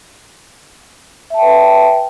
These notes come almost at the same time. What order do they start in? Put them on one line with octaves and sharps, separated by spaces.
E5 A5 G5 B4